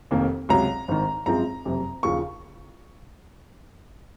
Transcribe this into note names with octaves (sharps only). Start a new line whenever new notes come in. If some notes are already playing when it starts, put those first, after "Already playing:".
F1 F2 D#3 A#3
C#2 C3 F#3 A#5
G#1 G#2 D#3
G#1 F#2 F3 G#3 C4 A#5
F#1 F2 C3
D#2 C#3 F3 C#6